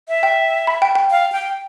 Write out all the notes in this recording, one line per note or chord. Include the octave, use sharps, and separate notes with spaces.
E5
G5
B5
G5
G5
F5
G5